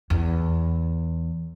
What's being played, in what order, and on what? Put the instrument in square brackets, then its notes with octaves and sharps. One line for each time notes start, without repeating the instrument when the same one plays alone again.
[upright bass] E2